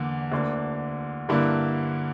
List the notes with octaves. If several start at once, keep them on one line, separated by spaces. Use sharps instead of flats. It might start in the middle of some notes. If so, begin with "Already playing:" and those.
Already playing: E2 D3 A#3
D2 D3 A#3 D4
G2 D3 A#3 E4